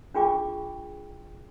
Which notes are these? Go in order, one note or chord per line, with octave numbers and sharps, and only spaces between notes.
D4 F4 G#4 G5 C#6 D6